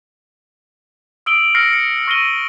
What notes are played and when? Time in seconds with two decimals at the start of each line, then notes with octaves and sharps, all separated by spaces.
1.26 D#6 E6 D7 F#7 G7
1.55 E6 F6 A#6 C7 C#7
1.73 C7 C#7
2.07 C#6 F6 A#6 C7 D#7 G7